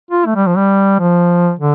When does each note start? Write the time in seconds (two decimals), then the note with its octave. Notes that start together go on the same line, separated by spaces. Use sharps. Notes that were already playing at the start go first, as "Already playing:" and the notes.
0.10 F4
0.26 A3
0.35 G3
0.46 F3
0.56 G3
0.99 F3
1.59 D3